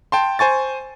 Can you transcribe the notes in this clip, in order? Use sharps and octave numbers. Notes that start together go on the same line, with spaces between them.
G5 A5 C6
C5 G#5 C#6 A6